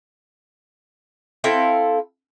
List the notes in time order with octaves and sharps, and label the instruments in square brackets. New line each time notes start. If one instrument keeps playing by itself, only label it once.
[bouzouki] C4 E4 A4 F5